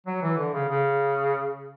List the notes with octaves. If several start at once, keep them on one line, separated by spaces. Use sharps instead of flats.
F#3
E3
D3
C#3
C#3